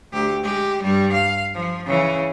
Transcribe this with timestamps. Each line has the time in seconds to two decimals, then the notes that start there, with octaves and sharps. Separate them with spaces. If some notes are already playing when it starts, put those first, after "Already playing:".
0.13 D2 G4
0.43 G#3 G4
0.82 G2 G3
1.13 F5
1.55 F3
1.87 C#3 E3